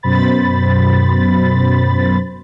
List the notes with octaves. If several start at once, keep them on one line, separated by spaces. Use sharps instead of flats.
F#2 B2 C5 B5 A6